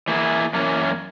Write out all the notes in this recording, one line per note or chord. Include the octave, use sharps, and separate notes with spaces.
E3 A#3 E4 G#4
F#2 E3 A#3 C#4